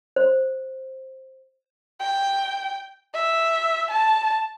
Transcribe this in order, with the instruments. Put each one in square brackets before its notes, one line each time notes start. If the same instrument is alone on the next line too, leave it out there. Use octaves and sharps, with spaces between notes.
[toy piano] C5
[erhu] G5
E5
A5